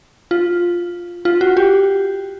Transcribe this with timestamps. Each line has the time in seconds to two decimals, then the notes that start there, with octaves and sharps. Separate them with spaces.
0.31 F4
1.25 F4
1.41 F#4
1.57 G4